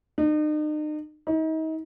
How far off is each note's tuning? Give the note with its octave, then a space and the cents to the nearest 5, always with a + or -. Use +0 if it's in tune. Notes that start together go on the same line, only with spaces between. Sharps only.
D#4 -40
D#4 +35